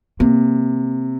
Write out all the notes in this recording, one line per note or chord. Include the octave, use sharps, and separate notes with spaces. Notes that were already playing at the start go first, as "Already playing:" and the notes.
C3 A#3